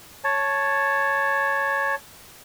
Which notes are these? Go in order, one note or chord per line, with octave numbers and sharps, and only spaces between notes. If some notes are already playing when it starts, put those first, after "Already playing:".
C#5 A5